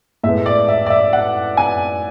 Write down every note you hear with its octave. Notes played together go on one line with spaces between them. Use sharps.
A2 G#3 B3 E5
D5
E5
D5
E5
F#5
G#5